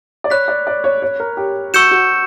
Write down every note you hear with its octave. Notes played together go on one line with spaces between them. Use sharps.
D5
C#5 B5 F#6 B6
D5
D5
C#5
C#5
A#4
G4
F#4 C#6 E6 G6 C#7 E7
F#4